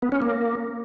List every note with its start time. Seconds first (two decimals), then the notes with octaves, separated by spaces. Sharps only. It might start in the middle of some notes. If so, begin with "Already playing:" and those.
0.02 B3
0.12 C#4
0.22 A#3